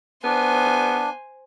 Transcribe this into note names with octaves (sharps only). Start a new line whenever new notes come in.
B3 D4 C5 G#5